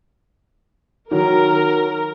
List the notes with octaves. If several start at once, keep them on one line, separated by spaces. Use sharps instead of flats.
D#3 F#3 A#4